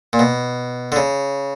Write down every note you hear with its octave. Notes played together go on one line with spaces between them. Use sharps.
A#2
B2
D3
C#3